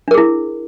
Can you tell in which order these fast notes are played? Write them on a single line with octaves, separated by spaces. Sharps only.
D4 A#4 G#4 E4